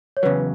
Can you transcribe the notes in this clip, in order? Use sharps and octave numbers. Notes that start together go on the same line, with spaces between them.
C#5
E2 C#3 F#3 B4